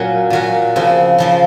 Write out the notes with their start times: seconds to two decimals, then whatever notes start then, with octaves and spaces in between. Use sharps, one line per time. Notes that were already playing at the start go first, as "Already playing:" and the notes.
Already playing: A#2 F#3 C#4 F#4
0.30 A#2 F#3 C#4 F#4
0.76 C#3 F3 C4
1.18 C#3 F3 C4